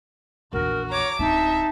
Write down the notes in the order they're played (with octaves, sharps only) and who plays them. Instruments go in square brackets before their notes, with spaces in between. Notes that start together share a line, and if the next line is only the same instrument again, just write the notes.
[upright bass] A#1 E2 [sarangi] F#4 [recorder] A#4
[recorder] C#5 [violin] A#5 D6
[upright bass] D1 C4 [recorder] D#4 [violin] E5 [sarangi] A5